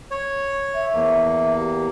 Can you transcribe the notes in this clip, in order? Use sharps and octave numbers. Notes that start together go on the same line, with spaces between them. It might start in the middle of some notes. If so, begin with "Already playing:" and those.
C#5
E5
E2 A#3
G4